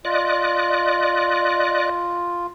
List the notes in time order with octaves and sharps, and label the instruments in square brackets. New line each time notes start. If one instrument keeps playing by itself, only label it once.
[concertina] F4 [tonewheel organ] D5 D#5 F#6